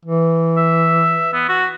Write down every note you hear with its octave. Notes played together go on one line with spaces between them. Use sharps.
E3
E5
B3
F#4